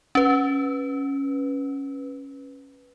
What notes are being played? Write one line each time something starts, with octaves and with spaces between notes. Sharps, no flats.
C#4 B4